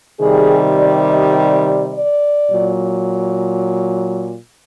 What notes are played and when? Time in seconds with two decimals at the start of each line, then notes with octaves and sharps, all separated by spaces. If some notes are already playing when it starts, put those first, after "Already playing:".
0.20 C3 D#3 G3 G#4
0.78 D5
1.07 D#5
1.36 D5
1.65 D5
1.93 D5
2.51 A#2 F#3